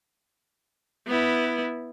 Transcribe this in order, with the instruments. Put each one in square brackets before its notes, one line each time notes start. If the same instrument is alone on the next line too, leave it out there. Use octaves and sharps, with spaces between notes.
[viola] B3 E4